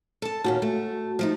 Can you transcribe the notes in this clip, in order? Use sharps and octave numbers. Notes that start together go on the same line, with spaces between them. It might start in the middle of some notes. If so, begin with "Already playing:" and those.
A4 A5
D#2 A#2 C#4 F#4 A5
A3
F3 A3 D#4